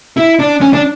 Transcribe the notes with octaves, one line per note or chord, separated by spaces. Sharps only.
E4
D4
C#4
D4